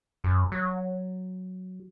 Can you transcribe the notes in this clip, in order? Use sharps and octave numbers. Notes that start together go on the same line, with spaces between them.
F#2
F#3